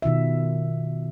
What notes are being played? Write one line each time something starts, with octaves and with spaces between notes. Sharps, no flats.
B2 D#3 F4 E5